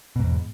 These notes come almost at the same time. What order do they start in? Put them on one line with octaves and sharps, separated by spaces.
B2 G#2 E2